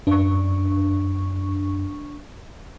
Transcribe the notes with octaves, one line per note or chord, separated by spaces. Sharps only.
F#2 D4 C#6